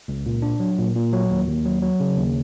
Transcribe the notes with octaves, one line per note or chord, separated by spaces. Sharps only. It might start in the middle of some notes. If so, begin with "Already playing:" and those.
C#2
A#2
D4
F#3
A#2
A#2
F#3
D#2
D#2
F#3
F#3
C#3
D#2